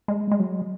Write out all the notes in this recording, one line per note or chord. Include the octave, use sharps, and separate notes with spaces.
G#3
G#3
F#3